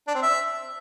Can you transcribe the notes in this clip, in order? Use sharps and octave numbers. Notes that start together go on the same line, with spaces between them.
D4
C4
E5